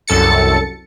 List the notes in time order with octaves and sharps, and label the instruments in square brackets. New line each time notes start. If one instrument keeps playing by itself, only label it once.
[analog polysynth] C2 F#2 A4 A6 C#7